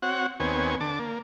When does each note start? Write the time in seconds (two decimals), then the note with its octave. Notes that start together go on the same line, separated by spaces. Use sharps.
0.02 C4 F#4 C#5 F#5
0.40 D#2 B3 C4 C#5 G#5
0.80 D3 A5 D6
0.99 A#3